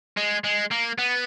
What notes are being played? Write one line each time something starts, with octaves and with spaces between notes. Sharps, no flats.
G#3
G#3
A#3
B3